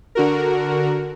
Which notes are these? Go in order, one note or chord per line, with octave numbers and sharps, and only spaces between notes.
D3 F#4 A#4